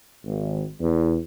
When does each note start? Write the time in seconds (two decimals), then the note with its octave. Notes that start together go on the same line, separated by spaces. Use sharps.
0.25 G#1
0.79 E2